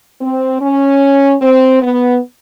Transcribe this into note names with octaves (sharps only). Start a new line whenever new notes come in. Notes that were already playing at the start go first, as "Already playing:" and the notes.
C4
C#4
C4
B3